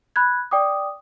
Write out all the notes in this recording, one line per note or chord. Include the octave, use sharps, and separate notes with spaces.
B5 F#6 G#6
D5 G5 D6 D#6